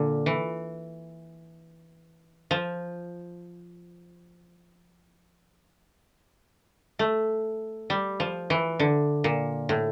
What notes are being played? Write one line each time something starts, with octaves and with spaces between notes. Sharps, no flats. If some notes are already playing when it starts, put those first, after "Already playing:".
Already playing: A#2 D3
E3
F3
A3
G3
F3
E3
D3
A#2
A2